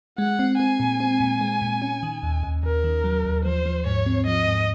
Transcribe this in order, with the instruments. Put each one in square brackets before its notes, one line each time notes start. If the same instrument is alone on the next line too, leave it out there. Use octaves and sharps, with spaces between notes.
[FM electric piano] G#3 [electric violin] F#5
[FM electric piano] C4
[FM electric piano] C4 [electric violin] G#5
[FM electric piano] A#2
C4
A#2
G#3
A#2
C#4
D#3
D#2
D#2
[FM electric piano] D#2 [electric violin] A#4
[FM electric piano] D#3
F#3
D#2
[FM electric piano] F3 [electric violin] C5
[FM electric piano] F3
[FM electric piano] G#2 [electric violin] C#5
[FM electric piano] C4
[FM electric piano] F3 [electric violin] D#5
[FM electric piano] G#2